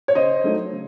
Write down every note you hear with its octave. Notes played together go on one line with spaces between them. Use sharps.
C#5
C#3 C5 D#5
F#3 A3 D#4
C#3